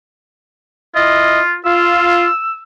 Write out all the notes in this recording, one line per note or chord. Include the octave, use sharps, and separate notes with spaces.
E4 F4 D#5
F4 E6